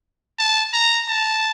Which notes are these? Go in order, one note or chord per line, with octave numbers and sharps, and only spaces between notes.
A5
A#5
A5